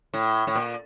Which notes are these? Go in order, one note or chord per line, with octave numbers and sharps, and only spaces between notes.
A2
A2
A#2